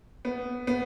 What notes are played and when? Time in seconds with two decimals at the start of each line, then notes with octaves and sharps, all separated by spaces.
0.25 B3
0.67 B3